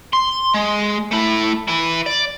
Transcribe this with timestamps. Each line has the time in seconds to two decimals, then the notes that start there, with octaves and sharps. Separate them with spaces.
0.13 C6
0.54 G#3
1.11 A3 E4
1.68 E4 B4
2.06 D5